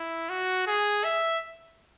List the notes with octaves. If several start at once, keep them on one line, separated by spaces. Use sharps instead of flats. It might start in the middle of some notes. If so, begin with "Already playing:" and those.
Already playing: E4
F#4
G#4
E5